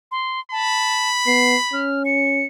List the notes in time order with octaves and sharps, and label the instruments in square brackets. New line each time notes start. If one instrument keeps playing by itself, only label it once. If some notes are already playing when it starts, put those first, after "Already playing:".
[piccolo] C6
[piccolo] A5 [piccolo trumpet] B5
[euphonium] B3 [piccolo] C7
[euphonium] C#4 [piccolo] F6
[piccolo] C#7